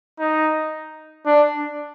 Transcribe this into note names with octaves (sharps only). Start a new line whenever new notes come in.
D#4
D4